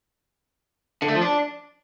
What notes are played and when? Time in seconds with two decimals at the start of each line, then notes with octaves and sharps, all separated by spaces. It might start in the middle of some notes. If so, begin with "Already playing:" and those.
1.02 D3
1.08 A3
1.15 F3
1.21 D4